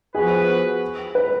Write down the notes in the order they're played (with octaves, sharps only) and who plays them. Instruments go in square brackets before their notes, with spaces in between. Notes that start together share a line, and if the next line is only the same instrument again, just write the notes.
[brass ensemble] F3 B3 F#4 B4 [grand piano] G#4
[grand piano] B4